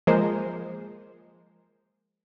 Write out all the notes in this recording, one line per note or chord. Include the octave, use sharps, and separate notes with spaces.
F3 G#3 A#3 A#4 C5